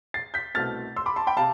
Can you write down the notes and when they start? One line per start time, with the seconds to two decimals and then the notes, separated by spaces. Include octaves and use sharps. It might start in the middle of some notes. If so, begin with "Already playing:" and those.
0.14 A6 C7
0.34 G6 B6
0.54 C2 B2 A3 C4 F6 A6
0.96 C6 E6
1.06 B5 D6
1.16 A5 C6
1.27 G5 B5
1.37 C3 F5 A5